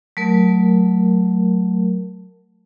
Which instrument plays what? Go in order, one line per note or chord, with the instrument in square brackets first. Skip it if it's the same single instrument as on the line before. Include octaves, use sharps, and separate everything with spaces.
[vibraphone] F#3 A3 A#4